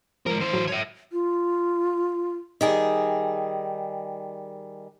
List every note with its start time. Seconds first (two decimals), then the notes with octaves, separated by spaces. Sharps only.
0.26 G#2 F3 A#4
0.40 E3 C5
0.53 A2 F#3
0.67 C#5 E5
1.12 F4
2.61 D#3 G3 G#4